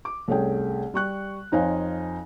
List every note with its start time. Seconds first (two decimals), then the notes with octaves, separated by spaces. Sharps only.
0.05 D6
0.28 C2 A3 C#4 G#4 G5
0.94 G3 C#6 F#6
1.52 F2 D#4 C5 C#5 F5 G#5